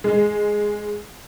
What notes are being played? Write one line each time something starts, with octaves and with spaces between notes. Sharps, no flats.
G#3